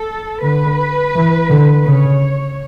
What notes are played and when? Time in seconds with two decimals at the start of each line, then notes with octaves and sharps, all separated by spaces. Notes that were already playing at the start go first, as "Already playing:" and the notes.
Already playing: A4
0.42 D3 B4
1.15 E3
1.50 D3
1.85 C#3 C#5